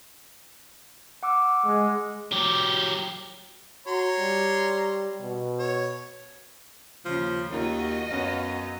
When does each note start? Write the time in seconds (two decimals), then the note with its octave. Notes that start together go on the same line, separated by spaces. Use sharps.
1.23 F#5 D6 E6
1.65 G#3
2.32 F#3 G4
3.87 F#4 C#5 A#5 C6
4.19 G3
5.20 B2
5.59 C#5
7.05 D#2 C#3 F3
7.52 D#2 C#4 F4 F#4 A#4 D#5
8.11 F#2 B3 C#4 F5